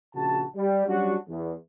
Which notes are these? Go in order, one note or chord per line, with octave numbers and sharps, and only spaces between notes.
A#1 C#3 F#4 A5
G3
F#3 G3 C#4 D4 F#4
E2